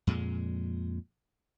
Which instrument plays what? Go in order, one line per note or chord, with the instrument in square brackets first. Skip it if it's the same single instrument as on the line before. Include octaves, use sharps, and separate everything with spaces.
[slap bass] F2 A#2 G#3